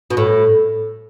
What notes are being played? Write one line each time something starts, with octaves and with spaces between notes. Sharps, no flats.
B2
A2